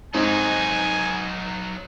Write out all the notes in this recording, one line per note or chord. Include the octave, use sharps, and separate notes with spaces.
G#2 F#3 C4 D#4 G#5